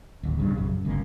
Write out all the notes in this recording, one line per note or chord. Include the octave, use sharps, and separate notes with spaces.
D1 D#2
D#1 A#1 G2 C#3
A#1 F#2 C#3
F#2
G1 C#2 A#3 C#4